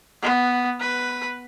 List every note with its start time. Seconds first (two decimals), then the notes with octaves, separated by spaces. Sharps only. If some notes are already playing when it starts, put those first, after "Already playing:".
0.22 B3
0.80 B4